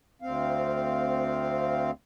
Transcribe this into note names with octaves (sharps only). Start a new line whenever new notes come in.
D2 C4 F5